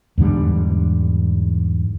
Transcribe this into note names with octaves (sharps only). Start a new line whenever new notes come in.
E2 G#2 D3 G3